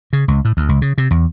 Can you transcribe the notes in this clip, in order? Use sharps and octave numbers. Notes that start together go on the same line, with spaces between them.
C#3
C#2
A2
D2
C#2
C#3
C3
E2